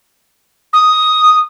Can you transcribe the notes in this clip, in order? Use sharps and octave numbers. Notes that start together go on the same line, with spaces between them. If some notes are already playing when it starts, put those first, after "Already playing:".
D#6